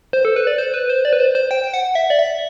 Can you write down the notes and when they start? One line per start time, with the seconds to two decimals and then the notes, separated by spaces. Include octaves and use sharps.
0.13 C5
0.25 A4
0.36 B4
0.47 D5
0.58 C5
0.74 B4
0.89 C5
1.05 D5
1.13 B4
1.20 C5
1.35 C5
1.51 G5
1.64 G5
1.74 F#5
1.95 E5
2.10 D5
2.19 E5